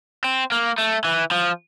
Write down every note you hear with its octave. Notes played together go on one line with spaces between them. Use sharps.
C4
A#3
A3
E3
F3